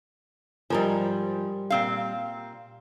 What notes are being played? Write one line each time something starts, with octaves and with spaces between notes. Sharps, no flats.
G#2 F3 G3 A#4 G#5
A#2 C4 F5